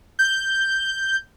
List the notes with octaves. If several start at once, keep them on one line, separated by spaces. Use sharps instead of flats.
G6